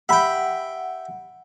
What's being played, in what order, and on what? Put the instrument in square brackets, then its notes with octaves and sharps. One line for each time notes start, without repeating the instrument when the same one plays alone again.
[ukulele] G4 B5 [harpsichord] E5 G5 [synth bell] F#5